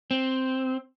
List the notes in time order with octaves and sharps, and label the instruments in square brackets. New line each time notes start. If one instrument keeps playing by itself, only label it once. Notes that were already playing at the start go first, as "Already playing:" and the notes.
[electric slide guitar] C4